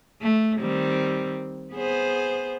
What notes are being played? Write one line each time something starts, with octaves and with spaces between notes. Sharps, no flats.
A3
D#3 G3 C4
B3 G#4 C5